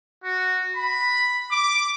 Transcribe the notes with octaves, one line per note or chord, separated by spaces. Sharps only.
F#4
B5
D6